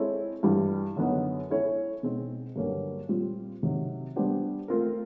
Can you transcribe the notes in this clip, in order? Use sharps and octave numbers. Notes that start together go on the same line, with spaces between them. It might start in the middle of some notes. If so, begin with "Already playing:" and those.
Already playing: G#3 C4 E4 A4 C#5
G2 E3 G3
F#2 D3 F#3 B3 D#4
G#3 C#4 E4 A4 C#5
B2 G#3 C4 D#4
G2 D3 F#3 A#3 C#4
A#2 G3 C4 F4
C3 D#3 F#3
G3 B3 D4 G4 C5
A3 C4 F4 A#4